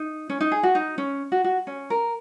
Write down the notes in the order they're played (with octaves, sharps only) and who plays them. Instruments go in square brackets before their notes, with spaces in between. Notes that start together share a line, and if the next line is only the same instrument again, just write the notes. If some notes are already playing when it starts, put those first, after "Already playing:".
Already playing: [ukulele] D#4
C#4
D#4
G#4
F#4
D#4
C#4
F#4
F#4
C#4
A#4